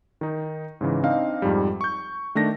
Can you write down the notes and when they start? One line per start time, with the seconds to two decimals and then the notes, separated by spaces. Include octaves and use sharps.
0.21 D#3 D#4
0.81 G#2 C#3 E3
1.03 C4 D4 D#4 D#5 F5
1.42 F2 G#2 G3
1.81 C#6 G6
2.35 D#3 A3 D4 A#6